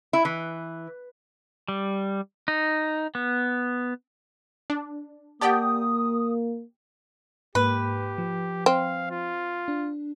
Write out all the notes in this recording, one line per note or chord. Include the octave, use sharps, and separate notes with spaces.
E4
E3
G3
D#4
B3
D4
A#3 G4 D5 F#5 G5 A5 D#6
G#2 A#3 G4 B4
F3
C4 F5
F4
D4